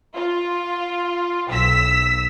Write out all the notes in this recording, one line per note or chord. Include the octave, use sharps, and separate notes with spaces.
F4
B1 E6 B6